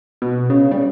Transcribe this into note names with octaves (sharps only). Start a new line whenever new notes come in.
B2
C#3
G3